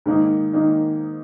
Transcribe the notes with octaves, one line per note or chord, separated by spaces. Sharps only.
G#2 D#3 A#3 D#4
D#3 A#3 D#4